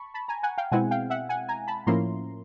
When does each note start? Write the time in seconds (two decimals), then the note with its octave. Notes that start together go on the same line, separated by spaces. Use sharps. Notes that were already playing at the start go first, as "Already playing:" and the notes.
Already playing: A5 B5 C#6
0.14 A5 B5
0.28 G#5 A#5
0.43 F#5 G#5
0.58 F5 G5
0.72 B2 G#3 C4 E4 F#5 G#5
0.91 F5 G5
1.10 E5 F#5
1.29 F#5 G#5
1.48 G#5 A#5
1.67 A5 B5
1.87 A2 F3 A#3 C#4 E4 A#5 C6